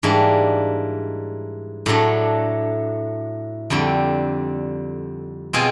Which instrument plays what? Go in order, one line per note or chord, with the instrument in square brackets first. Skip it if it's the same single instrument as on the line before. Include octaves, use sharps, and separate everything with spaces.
[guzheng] G#2 E3 G3 A#3 D4
A2 F#3 A3 D4
F2 D3 G3 C4
B2 G#3 C4 F4 G#4